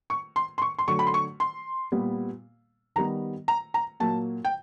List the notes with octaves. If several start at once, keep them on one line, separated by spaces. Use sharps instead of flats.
C#6
C6
C6
C#6
C6
D3 F#3 A3 C#6
B5
C6
C#6
C6
A#2 G3 B3
D#3 G3 B3 A#5
A#5
A#5
A#2 F#3 A#3 A5
G5